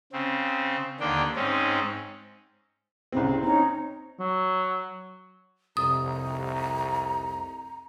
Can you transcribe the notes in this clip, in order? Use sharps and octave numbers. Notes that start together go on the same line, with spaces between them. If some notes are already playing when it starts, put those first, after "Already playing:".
C#3 C4
D#2 D3 A#3 D4 G5
G#2 C4 C#4 D#4
C2 C#3 C4
C4 C#4 D#4 A#5
F#3
F1 C2 A#5 D#6